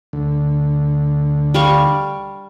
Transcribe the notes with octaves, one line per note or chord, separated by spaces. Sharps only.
D2 D3
G3 F5 C#6